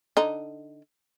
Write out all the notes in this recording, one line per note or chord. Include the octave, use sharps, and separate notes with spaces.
D3 D#4